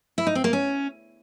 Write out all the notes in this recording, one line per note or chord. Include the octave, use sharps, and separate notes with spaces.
E4
D#4
C4
A#3
C#4